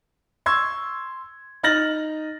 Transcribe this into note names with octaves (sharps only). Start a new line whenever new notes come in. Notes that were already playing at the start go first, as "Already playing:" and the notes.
C6 C#6 E6 G#6
D#4 F6 A6 A#6 F#7